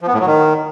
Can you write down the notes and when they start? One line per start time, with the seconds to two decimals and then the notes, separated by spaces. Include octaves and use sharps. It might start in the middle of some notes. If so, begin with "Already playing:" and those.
0.01 F3
0.07 B3
0.14 A2
0.20 F#3
0.26 D#3